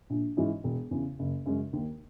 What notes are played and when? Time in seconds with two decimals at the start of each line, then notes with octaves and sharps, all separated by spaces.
0.10 A#1
0.37 G#2 E3 G#3 C#4
0.64 E1
0.91 E2 C#3
1.19 F#1
1.46 F#2 C#3 G#3 C#4
1.73 D#2